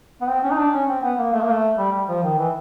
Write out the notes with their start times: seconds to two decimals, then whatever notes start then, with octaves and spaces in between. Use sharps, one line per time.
0.21 B3
0.29 C4
0.43 C#4
0.51 D#4
0.58 D4
0.73 C#4
0.89 C4
1.03 B3
1.19 A#3
1.33 A3
1.41 A#3
1.50 A3
1.78 G3
1.93 G3
2.08 F3
2.23 D#3
2.38 E3